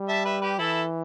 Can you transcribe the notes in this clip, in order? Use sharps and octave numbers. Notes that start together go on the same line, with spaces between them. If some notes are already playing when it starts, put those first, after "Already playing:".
Already playing: G3
E5 A5
B4 E5
G4 B4
E3 E4 A4